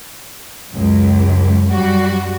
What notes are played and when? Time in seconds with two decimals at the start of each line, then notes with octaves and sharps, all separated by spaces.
0.72 C#2 F#2
1.71 F#2 G3 F#4